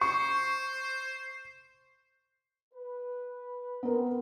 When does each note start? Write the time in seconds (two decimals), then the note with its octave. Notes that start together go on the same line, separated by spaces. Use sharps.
0.01 C5 C#6
2.74 B4
3.83 B3 C4 A#4